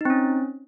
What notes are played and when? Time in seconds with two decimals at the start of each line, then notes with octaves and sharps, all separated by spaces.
0.01 D#4
0.05 C4
0.10 C#4